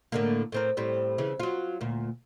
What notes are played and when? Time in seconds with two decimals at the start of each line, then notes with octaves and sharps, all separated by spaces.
0.12 A2 D3 A#3
0.52 A2 C4 A#4
0.77 A2 G3 C4
1.18 C#3 E3
1.40 F#3 F4
1.81 D2 A#2